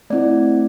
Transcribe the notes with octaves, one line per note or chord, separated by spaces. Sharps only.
A3 C4 E4 D5